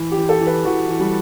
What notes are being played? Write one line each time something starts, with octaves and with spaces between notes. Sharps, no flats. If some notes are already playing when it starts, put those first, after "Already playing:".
Already playing: E3
G4
E3
A4
E3
B4
E3 F#4
E3
G3